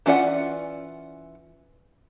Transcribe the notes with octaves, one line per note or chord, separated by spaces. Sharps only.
E3 C#4 F4 D5 F#5